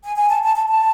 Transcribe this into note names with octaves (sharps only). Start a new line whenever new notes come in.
G#5
G#5
A5
A5
A5
A5